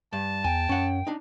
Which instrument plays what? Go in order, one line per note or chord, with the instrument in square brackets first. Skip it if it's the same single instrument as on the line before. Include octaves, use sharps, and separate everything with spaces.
[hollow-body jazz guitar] G2 [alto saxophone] A5
[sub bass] E2 [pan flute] G5 [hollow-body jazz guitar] G#5
[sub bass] F#2 [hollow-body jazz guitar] C#4 F#5
[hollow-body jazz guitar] D4 D#4